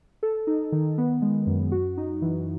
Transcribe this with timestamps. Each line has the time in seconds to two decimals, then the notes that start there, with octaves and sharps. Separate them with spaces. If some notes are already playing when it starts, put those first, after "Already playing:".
0.23 A4
0.47 D#4
0.72 D#3
0.98 B3
1.22 G#3
1.47 F#2
1.72 F#4
1.97 D#4
2.22 E3